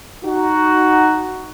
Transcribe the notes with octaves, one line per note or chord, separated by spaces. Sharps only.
D#4 F#4